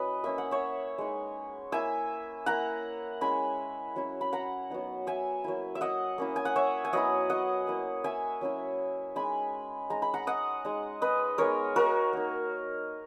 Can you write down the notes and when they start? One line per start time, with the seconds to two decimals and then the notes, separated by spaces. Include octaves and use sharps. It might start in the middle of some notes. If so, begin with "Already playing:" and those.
Already playing: F#3 C#4 E4 B4 D#5
0.24 A#3 C#4 E4 E5
0.38 F#5
0.51 C#5 E5
0.98 G#3 D#4
1.72 A#3 E4 E5 G#5
2.46 A#3 E4 F#5 A#5
3.21 G#3 C#4 E4 G#5 B5
3.96 F#3 C#4 E4
4.21 B5
4.33 F#5 A#5
4.70 F#3 B3 D#4
5.07 E5 G#5
5.44 F#3 A#3 E4
5.75 E5
5.81 D#5 F#5
6.18 A#3 C#4 E4
6.36 G#5
6.45 F#5
6.56 C#5 E5
6.85 G#5
6.93 F#3 B3 E4 D#5 F#5
7.30 D#5 F#5
7.67 A#3 E4
8.04 E5 G#5
8.41 F#3 C#4 E4
9.16 G#3 D#4 G#5 B5
9.90 G#3 D#4 A#5
10.02 B5
10.14 F#5 A#5
10.27 D#5 F#5
10.65 G#3 D#4
11.02 B4 D#5
11.38 G#3 B3 D#4 A#4 C#5
11.76 F#4 A#4
12.13 A#3 D#4